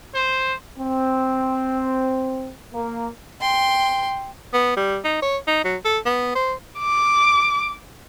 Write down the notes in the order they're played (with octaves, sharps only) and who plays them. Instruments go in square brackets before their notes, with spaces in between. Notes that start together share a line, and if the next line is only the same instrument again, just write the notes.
[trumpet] C5
[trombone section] C4
A#3
[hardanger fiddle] G5 C6
[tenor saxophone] B3
G3
D#4
C#5
D#4
F#3
A4
B3
C5
[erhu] D6